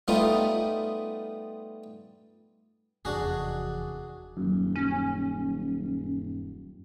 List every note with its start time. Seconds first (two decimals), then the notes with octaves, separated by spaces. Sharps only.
0.08 G3 A3 B3 D#4 F4
3.05 F1 E2 D4 F#4 G#4
4.37 D#1 F#2
4.76 C#4